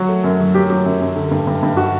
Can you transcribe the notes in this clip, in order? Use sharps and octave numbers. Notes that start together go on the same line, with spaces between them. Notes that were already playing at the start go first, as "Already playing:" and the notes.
Already playing: F#3 F#4
A3
F#2
F#3
F#3 G4
F#3
F#2
F#2
D3
G2
G2
G2
F#4